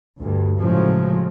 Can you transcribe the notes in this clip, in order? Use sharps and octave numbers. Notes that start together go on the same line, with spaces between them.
D2 G2
A2 C#3 F3 F#3 G#3